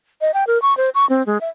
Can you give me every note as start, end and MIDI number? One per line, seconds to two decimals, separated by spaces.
0.21 0.31 75
0.34 0.47 79
0.47 0.60 70
0.62 0.76 85
0.77 0.90 72
0.95 1.08 85
1.09 1.25 60
1.26 1.40 56
1.41 1.49 76